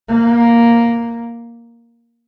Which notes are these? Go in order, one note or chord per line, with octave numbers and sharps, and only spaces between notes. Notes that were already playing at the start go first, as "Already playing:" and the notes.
A#3